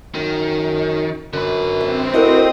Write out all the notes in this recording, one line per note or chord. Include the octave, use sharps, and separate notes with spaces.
F#2 D#3
F#2 D3 B4
C4 E5
D2 E4 F#4 A#4 D#5